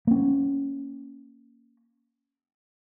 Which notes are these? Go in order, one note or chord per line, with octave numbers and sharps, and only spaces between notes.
A#3 C#4